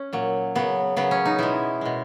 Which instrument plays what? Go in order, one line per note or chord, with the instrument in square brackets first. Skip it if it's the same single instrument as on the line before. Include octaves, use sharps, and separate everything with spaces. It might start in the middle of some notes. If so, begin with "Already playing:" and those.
Already playing: [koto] C#4
A#2 F#3
C#3 F#3 B3
C#3 F#3 B3
C#4
D#4
B2 G#3 E4
B2 G#3